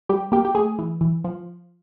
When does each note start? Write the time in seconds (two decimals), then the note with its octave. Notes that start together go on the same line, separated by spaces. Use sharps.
0.09 G3 G4
0.32 A#3 G4
0.45 G4
0.55 A3 G#4
0.79 E3
1.01 E3
1.24 F3